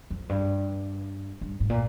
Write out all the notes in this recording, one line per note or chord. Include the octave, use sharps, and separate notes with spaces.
F2
G2
G2
G#2
A#2